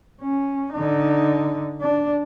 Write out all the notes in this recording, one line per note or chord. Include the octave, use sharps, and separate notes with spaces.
C#4
D3 D#4
D4